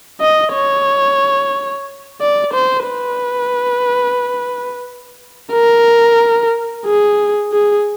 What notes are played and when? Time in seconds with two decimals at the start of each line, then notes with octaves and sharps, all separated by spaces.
0.21 D#5
0.54 C#5
2.21 D5
2.54 C5
2.87 B4
5.53 A#4
6.86 G#4
7.52 G#4